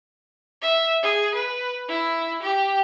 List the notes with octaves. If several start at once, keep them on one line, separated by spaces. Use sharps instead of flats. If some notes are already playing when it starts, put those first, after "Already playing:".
E5
G#4
B4
E4
G4